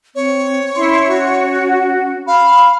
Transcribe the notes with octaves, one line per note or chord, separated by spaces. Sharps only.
C4 C#5
C#4 E4 C6
F#4
F5 B5